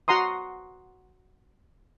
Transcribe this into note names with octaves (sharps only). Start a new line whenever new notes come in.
F#4 F#5 A#5 C6 D#6